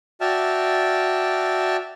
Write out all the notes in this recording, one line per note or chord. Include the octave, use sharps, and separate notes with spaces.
F#4 D5 E5 G5 A5 F6